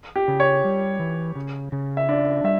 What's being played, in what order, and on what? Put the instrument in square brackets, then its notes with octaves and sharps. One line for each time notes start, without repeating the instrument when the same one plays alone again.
[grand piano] G4
[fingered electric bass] C#3
[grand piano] C#5
[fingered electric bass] G3
E3
C#3
C#3
[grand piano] E5
[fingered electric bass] D4 [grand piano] D5
[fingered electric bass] G3 [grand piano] E5